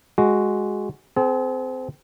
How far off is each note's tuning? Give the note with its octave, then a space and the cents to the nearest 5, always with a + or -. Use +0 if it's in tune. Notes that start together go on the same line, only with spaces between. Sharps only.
G#3 +0 F#4 +0
C4 -20 G#4 +45